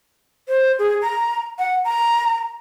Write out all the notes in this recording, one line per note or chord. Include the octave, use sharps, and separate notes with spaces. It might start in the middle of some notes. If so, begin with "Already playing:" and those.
C5
G#4
A#5
F#5
A#5